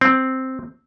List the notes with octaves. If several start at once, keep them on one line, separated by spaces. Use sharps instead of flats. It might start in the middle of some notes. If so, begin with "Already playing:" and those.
C4